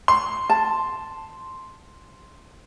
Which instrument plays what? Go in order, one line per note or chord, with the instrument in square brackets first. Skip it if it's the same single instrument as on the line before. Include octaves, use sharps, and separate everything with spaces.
[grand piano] C6
[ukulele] A5